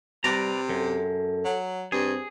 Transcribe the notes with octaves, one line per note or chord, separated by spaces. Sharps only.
C3 G3 B4 D5 A#5
F#2 A4
F#3
G2 C4 G#4